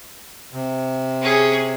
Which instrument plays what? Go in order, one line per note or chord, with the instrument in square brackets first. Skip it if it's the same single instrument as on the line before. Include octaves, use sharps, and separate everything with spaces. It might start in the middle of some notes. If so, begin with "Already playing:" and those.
[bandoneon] C3
[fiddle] C#4 G#4